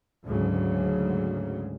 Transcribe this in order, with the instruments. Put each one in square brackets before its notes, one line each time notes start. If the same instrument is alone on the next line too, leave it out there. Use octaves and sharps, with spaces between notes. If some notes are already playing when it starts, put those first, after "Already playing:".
[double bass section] D2 G#2 C#3 F#3